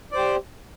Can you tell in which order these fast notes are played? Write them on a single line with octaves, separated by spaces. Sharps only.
D5 C5 G4